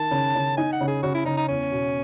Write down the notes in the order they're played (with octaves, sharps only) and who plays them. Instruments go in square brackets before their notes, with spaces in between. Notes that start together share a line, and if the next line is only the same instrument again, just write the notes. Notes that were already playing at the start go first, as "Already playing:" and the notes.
Already playing: [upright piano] D#3 [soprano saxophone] A5
[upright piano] C#3
C#3
[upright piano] D#4 [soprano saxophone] G#5
[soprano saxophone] F#5
[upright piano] C#3
[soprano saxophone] G#4
[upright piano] C#3 [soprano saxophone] F#4
[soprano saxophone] E4
[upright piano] C#3 [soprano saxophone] D#4
[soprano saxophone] D#4
[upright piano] E2 [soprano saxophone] C#4
[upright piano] B2